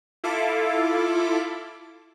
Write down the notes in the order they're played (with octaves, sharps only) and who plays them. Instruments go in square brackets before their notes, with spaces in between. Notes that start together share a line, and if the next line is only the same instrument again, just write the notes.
[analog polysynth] E4 F4 A4 D6